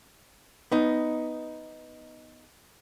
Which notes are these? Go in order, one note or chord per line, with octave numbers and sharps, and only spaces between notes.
B3 D#4